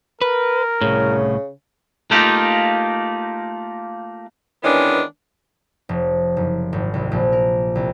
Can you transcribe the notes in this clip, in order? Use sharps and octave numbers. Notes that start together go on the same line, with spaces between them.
A#4 B4
C2 A2 C#3
A3 A#3 D#4 F4 G4
D#3 E3 G#3 B3 C#4 D4
F1
F#1
G#1
C2
A#1
A#4
C2